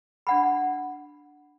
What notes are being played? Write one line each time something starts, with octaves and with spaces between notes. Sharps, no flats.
D4 F#5 B5